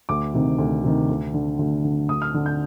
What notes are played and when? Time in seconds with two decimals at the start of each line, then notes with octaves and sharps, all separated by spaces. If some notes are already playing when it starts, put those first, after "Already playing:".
0.09 D2 D6
0.34 C3 D#3
0.58 D2
0.83 C3 D#3
1.09 D2
1.34 D3
1.59 D2
1.84 D3
2.08 D2 D#6
2.22 F6
2.34 D3
2.46 G6